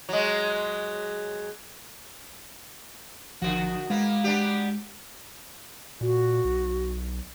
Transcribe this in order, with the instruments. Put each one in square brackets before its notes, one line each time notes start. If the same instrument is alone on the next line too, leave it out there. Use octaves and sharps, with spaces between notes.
[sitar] F#3 G#3
[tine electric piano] A1 F3 [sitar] D3 F#4
[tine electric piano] G#3 [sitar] A#3 B3
[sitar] B3 D4 G4
[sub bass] A#2 [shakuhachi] F#4
[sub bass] B1